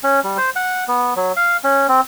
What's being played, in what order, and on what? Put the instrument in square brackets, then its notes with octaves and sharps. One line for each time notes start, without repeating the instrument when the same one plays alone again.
[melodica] C#4
G3
C5
F#5
B3
F#3
F5
C#4
C4